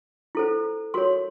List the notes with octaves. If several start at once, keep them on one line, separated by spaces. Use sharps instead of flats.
E4 A4 C5
F#4 A#4 C#5 C6